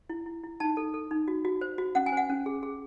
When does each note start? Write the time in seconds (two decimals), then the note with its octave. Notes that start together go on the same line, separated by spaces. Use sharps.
0.09 E4
0.26 E4
0.44 E4
0.60 D#4 A5
0.77 A4
0.94 A4
1.11 D#4
1.28 F#4
1.45 F#4
1.61 C5
1.78 F#4
1.95 C#4 F#5
2.06 G#5
2.12 C5 F#5
2.30 C#4
2.46 G#4
2.63 G#4